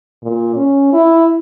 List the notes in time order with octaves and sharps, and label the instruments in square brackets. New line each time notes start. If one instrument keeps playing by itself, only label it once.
[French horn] A#2
C#4
E4